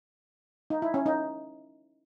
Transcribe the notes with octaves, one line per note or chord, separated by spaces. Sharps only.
D#4
E4
C#4
D#4